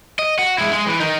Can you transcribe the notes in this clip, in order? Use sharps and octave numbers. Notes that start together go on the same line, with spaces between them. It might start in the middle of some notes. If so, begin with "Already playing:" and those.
D#5
F#4
G#3 E4
G#3
E3
D#4 A#4